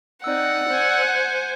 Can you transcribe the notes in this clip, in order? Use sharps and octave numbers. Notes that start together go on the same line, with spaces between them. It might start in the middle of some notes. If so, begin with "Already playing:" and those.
C4 D#4 D5 F#5 E6
C5 G#5